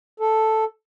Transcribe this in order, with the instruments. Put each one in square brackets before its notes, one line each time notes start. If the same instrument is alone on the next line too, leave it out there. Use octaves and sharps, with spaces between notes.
[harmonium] A4